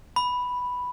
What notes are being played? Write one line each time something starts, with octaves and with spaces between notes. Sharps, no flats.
B5